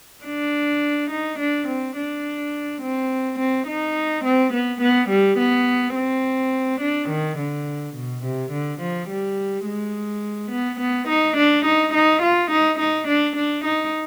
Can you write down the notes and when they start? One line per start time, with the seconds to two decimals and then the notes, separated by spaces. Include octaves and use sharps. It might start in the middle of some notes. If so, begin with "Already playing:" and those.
0.25 D4
1.11 D#4
1.39 D4
1.68 C4
1.96 D4
2.82 C4
3.39 C4
3.67 D#4
4.25 C4
4.53 B3
4.81 B3
5.09 G3
5.38 B3
5.95 C4
6.81 D4
7.09 D#3
7.38 D3
7.95 B2
8.24 C3
8.52 D3
8.80 F3
9.09 G3
9.66 G#3
10.51 B3
10.80 B3
11.08 D#4
11.37 D4
11.66 D#4
11.94 D#4
12.22 F4
12.51 D#4
12.79 D#4
13.08 D4
13.37 D4
13.65 D#4